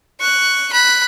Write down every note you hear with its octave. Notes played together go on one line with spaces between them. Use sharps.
C#6 F#6
B5 F#6